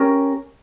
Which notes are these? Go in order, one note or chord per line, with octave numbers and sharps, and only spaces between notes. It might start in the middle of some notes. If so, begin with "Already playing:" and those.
Already playing: C#4 G4 A#4